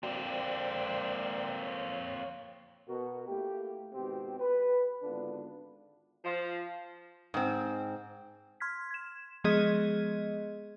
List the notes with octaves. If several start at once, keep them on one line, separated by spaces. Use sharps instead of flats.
A#3 C4 F#4 D5
C5 D5 G5
C#5
B2 F#4 A#4
A3 A#3 E4 G4
G#1 B2 C4 G4
B4
G#1 D3 B3 D4 F4 B4
F3
G#2 C4
C6 F6 G#6 B6
G#6 E7
F3 G#3 B3 G#4 D#5 G#6